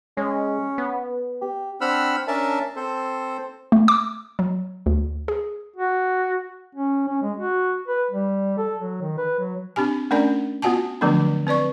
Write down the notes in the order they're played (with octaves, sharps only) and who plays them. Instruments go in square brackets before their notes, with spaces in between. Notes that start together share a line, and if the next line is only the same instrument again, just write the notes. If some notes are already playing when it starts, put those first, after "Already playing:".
[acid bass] G#3 [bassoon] C#4
[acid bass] B3
[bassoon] G4
[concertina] C4 D4 F#5 B5 E6 F6
C#4 D4 A#4 E5 A5
C4 A4 C5
[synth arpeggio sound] A3
D6
F#3
D2
G#4
[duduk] F#4
C#4
C#4
G#3
F#4
B4
G3
A4
F#3
D#3
B4
F#3
[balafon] C4 D4 G4 G#5
A3 C#4 D4 A#4 D5 G#5
B3 F4 F#4 F#5 G#5 A5
D3 F3 F#3 A3 B3 D4
C4 B4 D5 C#6